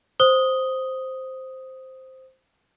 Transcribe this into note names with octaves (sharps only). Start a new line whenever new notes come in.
C5 D#6 G7